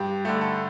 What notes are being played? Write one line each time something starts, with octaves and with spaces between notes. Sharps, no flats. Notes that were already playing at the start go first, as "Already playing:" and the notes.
Already playing: G2 G4
D3 A3 G4
A4